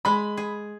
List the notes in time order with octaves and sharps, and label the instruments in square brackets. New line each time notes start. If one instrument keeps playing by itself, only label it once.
[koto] G#3 [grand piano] B5
[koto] G#4